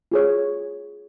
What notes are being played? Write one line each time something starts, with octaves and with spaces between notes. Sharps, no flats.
F4 G#4 C#5